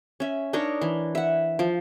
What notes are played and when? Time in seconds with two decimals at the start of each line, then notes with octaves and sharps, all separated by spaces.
0.20 C#4 E5
0.53 D4 D#4 A#4 C#5
0.82 E3
1.15 E5 F#5
1.59 F3